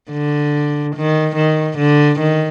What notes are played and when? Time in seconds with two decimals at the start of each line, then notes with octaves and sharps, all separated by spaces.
0.12 D3
0.96 D#3
1.36 D#3
1.78 D3
2.20 D#3